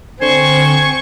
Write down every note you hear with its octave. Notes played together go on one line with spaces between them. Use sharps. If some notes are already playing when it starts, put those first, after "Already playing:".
D3 C4 C5 G#5 C#6